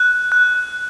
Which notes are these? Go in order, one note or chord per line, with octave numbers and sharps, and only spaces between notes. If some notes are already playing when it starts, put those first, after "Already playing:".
Already playing: F#6
F#6